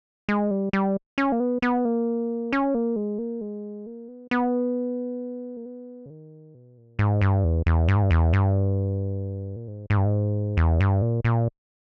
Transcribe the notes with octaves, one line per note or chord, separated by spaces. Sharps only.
G#3
G3
G3
C#4
A#3
B3
B3
A#3
C#4
A#3
G#3
A#3
G#3
A#3
B3
B3
A#3
B3
C#3
D#3
B2
A#2
G#2
G2
E2
E2
G2
G#2
G2
E2
G2
A#2
G#2
G#2
G2
G#2
E2
G2
A#2
A#2